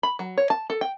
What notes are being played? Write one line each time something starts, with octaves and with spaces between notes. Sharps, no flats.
B5
F#3
C#5
A5
A4
G5